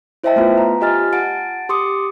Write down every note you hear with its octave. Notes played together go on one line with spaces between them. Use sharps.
E4 C5 D#5 E5 G5 A5
A3 B3 F4 B4
A#5
F4 G4 D#5 G#5 F6 A6
F#5 A5 A6 D7
G4 C6 D6 D#6 C#7